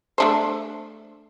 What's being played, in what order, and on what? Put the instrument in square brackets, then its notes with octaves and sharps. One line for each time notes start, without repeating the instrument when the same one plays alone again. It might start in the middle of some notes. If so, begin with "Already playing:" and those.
[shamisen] A3 D4 C5